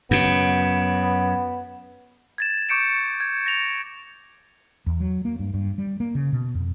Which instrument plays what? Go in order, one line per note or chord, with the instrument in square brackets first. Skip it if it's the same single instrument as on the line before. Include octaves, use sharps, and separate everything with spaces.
[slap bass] F#2 C#3 [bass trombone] B3
[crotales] G#6 A6 E7
C#6 D6 G6 C#7 D7 E7
G#6
A#6 F7
[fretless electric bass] E2
F#3
A#3
G2
G2
G3
A#3
C#3
B2
F2